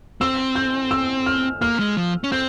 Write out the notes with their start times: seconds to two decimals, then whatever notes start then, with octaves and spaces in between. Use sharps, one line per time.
0.21 C4 E6
0.55 G6
0.91 E6
1.26 F6
1.61 A#3 F6
1.79 G#3
1.97 F3
2.24 C#4
2.32 C4 G6